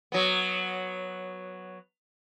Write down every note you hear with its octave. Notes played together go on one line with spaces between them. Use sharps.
F#3 B3